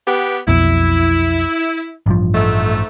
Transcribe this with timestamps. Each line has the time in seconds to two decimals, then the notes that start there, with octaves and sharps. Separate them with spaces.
0.06 B3 G4
0.48 B1 F2 B2 E4
2.06 A1 G2 F3
2.34 G#2 A3